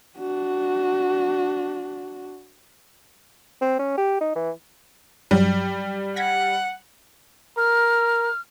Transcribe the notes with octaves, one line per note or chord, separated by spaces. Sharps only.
D4 F#4
C4
C#4
G4
D#4
E3
G2 F#3 G3
F#5 G#6 A#6 B6
A#4 F6